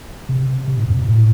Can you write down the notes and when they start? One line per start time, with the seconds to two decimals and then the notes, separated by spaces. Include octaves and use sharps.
0.29 C3
0.67 C3
0.77 G#2
0.86 F2
0.97 B2
1.06 A2